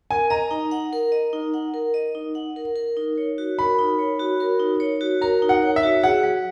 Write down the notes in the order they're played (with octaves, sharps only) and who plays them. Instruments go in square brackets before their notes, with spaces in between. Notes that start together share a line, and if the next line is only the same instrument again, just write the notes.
[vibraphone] A#4 [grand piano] G#5
[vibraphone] D#5 [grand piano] A#5
[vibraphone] D#4
F#5
A#4
D#5
D#4
F#5
A#4
D#5
D#4
F#5
A#4
A#4
D#4
C#5
F#4
[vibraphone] A#4 [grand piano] B5
[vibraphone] D#4
C#5
F#4
A#4
D#4
C#5
F#4
[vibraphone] A#4 [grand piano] A#5
[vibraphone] D#4
[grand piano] F#5
[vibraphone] C#5
[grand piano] E5
[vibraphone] F#4
[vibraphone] G#4 [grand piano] F#5
[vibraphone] F#3